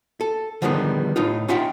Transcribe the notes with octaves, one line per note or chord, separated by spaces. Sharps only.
A4
D3 D#3 F3 G3 G#3 B3
A2 D#4 F4
C#4 D#4 F4 E5 F#5 G5